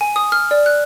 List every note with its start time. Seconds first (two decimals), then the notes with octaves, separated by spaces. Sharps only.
0.01 G#5
0.16 D#6
0.32 F6
0.51 D5
0.66 F#6